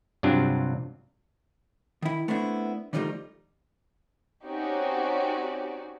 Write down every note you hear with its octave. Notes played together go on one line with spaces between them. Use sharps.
G2 C3 F#3 C4 D4 F4
D#3 E4
A3 B3 C4 D4 E4
D3 D#3 F3 G3 A3 D#4
C4 C#4 D#4 F#4 G4 D5